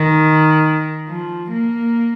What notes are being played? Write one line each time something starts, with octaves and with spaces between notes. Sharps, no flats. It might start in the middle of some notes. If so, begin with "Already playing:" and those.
Already playing: D#3
F3
A#3